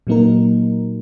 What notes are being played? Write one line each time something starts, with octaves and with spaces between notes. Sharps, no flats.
A#2 F#3 A#3 D#4 A#4